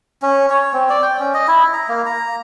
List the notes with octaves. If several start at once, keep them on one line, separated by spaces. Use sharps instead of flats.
C#4
C#5
C4
D5
G5
C#4
D#5
E4
A#5
A#3
A#5